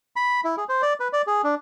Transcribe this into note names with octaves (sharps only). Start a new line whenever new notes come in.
B5
E4
G#4
C5
D5
B4
D5
G#4
D4